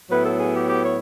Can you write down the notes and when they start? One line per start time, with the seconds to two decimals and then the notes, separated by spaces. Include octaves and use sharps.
0.10 A2 F#3 B3 E4 B4
0.24 A4
0.39 G#4
0.55 G4
0.69 G4
0.84 C#5